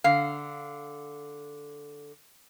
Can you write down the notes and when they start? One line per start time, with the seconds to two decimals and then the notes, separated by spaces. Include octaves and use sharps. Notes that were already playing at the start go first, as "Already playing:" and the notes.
0.04 D3 F5